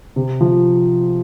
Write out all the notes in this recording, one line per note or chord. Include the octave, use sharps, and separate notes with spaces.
C3
F3